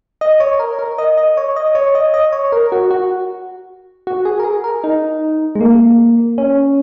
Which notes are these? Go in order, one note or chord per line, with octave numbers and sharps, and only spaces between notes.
D#5
C#5
A#4
A#4
D#5
D#5
C#5
D#5
C#5
D#5
D#5
C#5
A#4
F#4
F#4
F#4
G#4
A#4
G#4
A#4
D#4
G#3
A#3
C#4